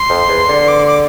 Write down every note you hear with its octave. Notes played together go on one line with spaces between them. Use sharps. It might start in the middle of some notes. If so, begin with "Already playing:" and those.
Already playing: C6
F2
E2
D3
D6
D6